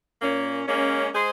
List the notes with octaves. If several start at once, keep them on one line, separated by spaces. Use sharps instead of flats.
A#2 A#3 C#4
G#3 A#3 C#4
G#3 G#4 C5